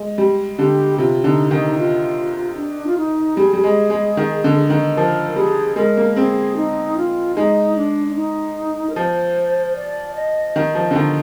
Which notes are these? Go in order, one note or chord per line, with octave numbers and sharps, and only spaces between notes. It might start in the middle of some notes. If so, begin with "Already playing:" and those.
Already playing: G#3
G3
D3 G4
C3 F4
D3 D#4
D#3 D#4
F4
D4
F4
D#4
G3 G#4
G3
G#3
G#3
D#3
D3
D#3
F3 A#4
G3 G#4
G#3 A#4
A#3
C4 G#4
D#4
F4
G#3 D#4
D4
D4
D#4
A#4
F3 C5
D5
D#5
D#3
F3
D3
D#3